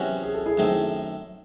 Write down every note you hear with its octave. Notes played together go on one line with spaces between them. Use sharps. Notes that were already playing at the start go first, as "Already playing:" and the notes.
Already playing: E2 C3 F#3 C#4 F#4
G#4
A4
E4 G#4
F#2 D#3 A3 C4 D#4